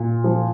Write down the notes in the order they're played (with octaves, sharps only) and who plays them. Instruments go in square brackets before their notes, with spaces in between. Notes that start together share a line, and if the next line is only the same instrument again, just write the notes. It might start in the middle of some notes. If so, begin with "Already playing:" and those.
Already playing: [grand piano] A#2
F3